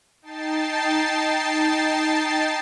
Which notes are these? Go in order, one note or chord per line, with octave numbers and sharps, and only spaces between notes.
D#4 G5 A5 A6 C7